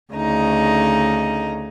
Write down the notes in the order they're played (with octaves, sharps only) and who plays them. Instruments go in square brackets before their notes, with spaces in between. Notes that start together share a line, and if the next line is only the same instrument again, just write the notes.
[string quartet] D2 C#3 D#4 D#5